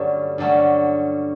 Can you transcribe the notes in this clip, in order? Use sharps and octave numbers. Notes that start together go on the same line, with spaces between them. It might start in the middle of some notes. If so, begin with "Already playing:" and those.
Already playing: G2 D3 F#3 A3 C#4
G2 D3 F#3 A3 C#4